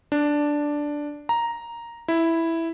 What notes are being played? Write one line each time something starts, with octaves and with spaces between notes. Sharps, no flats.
D4
A#5
E4